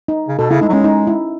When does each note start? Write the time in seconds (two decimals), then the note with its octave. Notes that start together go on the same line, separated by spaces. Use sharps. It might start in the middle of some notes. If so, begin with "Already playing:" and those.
0.08 D#4
0.28 C#3
0.39 B2 A4
0.50 C#3 E4
0.61 G#3 D#4
0.69 F#3
0.73 G#3 C#4
0.84 D#4
1.07 E4